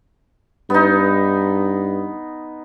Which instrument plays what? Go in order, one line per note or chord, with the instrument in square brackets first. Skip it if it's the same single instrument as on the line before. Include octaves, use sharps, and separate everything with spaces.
[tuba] G2 [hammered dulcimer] B3 D#4